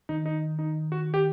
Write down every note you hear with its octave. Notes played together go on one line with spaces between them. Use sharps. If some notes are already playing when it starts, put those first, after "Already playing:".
D#3 D#4
D#4
D#4
F#4
G4